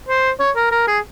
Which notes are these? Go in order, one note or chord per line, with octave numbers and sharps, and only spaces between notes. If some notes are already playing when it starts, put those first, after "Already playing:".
C5
C#5
A#4
A#4
G#4